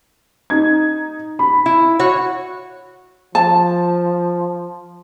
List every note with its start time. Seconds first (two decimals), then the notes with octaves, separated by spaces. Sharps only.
0.50 D#4 G#6
1.39 B5
1.66 E4
1.99 F#4 C#5
3.35 F3 A5